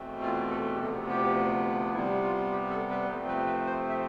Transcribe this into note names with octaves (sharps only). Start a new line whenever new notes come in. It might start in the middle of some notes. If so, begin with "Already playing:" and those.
Already playing: E2 B2 A3 C4
F4
A4
G4
D2 C3 F3 B3 A4
G4
C3 G3 B3 E4
F4
G4
A4
B4
C3 F3 A3 C4 A4
B4
B4
C5
E5